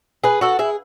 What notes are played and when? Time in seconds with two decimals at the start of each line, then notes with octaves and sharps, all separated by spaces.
0.24 G#4 B4
0.41 F#4 A4
0.59 E4 G#4